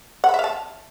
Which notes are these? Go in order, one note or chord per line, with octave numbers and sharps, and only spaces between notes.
F#5
B5
E5
F5
A5